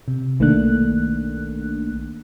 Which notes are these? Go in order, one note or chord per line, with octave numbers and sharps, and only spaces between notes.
C3
B1 D#3 A3 A#3 D4 F#6